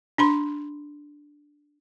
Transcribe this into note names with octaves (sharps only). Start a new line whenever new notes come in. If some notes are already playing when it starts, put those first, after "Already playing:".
D4 B5 C6